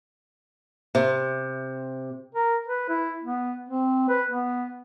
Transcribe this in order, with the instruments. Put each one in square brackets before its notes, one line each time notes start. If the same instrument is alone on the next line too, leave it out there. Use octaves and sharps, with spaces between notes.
[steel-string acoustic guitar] C3
[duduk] A#4
B4
E4
B3
C4
B4
B3